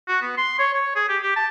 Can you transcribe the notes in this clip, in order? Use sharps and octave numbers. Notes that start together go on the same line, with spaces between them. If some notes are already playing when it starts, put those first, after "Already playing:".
F#4
B3
C6
C#5
C#5
G#4
G4
G4
A5